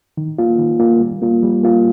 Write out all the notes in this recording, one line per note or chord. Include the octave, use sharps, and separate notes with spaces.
D#3
A#3 F4
D#3
A#3 F4
G3
A#3 F4
G3
A#3 F4